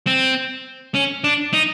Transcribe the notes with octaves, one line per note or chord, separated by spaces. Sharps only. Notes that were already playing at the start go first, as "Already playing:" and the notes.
C4
C#4
D4
D#4